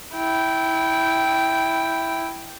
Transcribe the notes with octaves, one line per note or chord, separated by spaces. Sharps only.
E4 G5